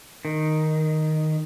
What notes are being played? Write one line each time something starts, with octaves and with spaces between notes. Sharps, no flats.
D#3